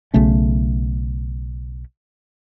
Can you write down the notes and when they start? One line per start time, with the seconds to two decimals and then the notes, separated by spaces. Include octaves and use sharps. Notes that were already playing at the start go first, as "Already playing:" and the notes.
0.14 B1 C#3 A3 C#4